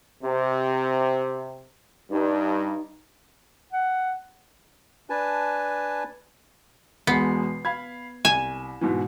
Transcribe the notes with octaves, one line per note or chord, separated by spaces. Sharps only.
C3
G2 D#4
F#5
D4 B4 G#5 A5
E1 G#3 B3 C7
F5 B5 G#6
C2 G#5 E7
G#2 B2 E3